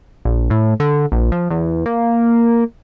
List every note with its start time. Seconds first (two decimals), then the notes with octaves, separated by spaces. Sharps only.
0.25 A#1
0.50 A2
0.80 D3
1.12 A#1
1.32 F3
1.51 E2
1.86 A#3